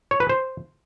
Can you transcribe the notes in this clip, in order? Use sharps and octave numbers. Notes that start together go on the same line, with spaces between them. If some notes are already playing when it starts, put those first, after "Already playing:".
C#5
B4
C5